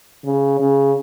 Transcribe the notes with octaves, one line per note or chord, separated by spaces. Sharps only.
C#3
C#3